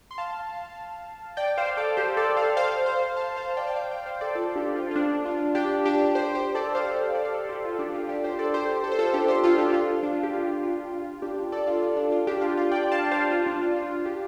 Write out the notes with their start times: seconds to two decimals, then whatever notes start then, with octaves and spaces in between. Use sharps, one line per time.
0.11 C6
0.18 F5 A5
1.37 D5 G5
1.57 C5 F5
1.77 A4 D5
1.97 G4 C5
2.17 A4 D5
2.37 C5 F5
2.57 C5 F5
2.86 C5 F5
3.16 F5 A5
3.36 C5 F5
3.57 D5 G5
3.67 G5
3.76 C5 F5
3.91 D5 G5
4.06 C5 F5
4.21 A4 D5
4.35 F4 A4
4.56 D4 G4
4.75 F4
4.91 F4
4.95 D4
5.25 F4
5.55 D4 G4
5.85 D4 G4
6.15 G4 C5
6.35 G4 C5
6.55 A4 D5
6.75 C5 F5
6.94 G4 C5
7.14 A4 D5
7.25 F5
7.34 A4 D5
7.44 A4
7.49 G4 C5
7.64 F4 A4
7.74 A4
7.79 D4 G4
7.94 F4
8.09 D4 G4
8.24 G4 C5
8.39 A4 D5
8.54 G4 C5
8.84 A4
8.92 C5
8.99 F4 A4
9.14 D4 G4
9.28 G4 C5
9.44 F4 A4
9.58 D4 G4
9.73 F4
10.03 D4
10.23 G4
10.33 F4
10.63 F4
10.93 F4
11.22 D4 G4
11.52 A4 D5
11.67 F4
11.82 F4
11.96 D4
12.12 F4
12.27 D4 G4
12.41 F4
12.57 F4
12.72 D5 G5
12.92 F5 A5
13.11 C5 F5
13.31 F4
13.46 D4
13.62 F4
13.76 F4
13.91 F4
14.05 D4 G4